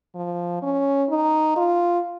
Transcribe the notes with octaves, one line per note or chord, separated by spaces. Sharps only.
F3
C#4
D#4
F4